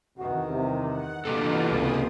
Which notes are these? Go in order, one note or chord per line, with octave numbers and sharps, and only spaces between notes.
E2 C3 D#3 F#4
C2 C3
F#5
B2 E3 A#3 D4 F4 G4 A4
C#2 C3 G#4 C5 D#6